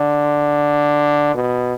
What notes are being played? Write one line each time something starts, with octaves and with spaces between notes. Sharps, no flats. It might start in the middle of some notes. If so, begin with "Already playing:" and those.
Already playing: D3
B2